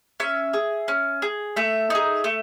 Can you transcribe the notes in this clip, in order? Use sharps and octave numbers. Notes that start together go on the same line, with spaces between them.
C#4 E5
G#4
C#4
G#4
A3 E5
D#4 G#4
A3